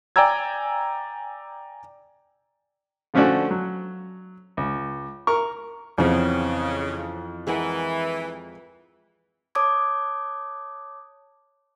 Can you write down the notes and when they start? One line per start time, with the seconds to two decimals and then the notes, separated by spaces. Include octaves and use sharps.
0.16 D5 G5 G#5 A#5 E6 G#6
3.14 D3 F3 A3 C#4 F#4 D5
3.51 F#3
4.57 C#2
5.27 A#4 C#6
5.98 F2 C#3 E3 B3 C4
7.47 E3 G#3 A#4 F#5
9.55 C#5 A5 D6 D#6 G#6